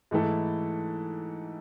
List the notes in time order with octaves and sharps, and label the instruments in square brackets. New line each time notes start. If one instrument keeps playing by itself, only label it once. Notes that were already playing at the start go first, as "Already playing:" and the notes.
[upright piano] G#2 E3 A3 E4 A4